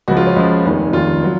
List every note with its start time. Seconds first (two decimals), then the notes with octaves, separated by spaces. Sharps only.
0.08 C#2 C#3 F3 F#4
0.17 F4
0.27 C#4
0.36 C#2 C#3 F3
0.65 F1 D#2 D#3
0.93 F1 D#2 D#3 F4
1.24 F#3